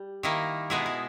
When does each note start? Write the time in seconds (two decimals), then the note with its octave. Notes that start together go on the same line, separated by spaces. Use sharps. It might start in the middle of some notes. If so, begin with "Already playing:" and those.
Already playing: G3
0.23 D#3 A#3 E4
0.70 B2 G#3 B3 E4 G#4
0.86 E4